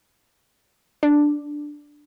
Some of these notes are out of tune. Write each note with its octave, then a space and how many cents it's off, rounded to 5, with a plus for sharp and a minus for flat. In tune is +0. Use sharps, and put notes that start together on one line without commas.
D4 +5